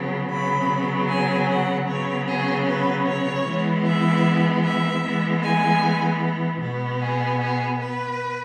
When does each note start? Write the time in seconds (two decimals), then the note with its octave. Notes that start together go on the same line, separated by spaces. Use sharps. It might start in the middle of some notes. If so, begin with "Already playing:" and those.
Already playing: C#3 F#3 B3
0.30 C#3 F#3 B3 B5
1.09 G#5
1.49 F#5
1.88 C#3 F#3 B3 C#5
2.28 G#4
2.67 B4
3.06 C#5
3.46 E3 G#3 B3
3.86 E5
4.64 E5
5.03 E3 G#3 B3
5.42 G#5
6.61 B2 B3
7.00 G#4
7.40 G#4
7.79 B4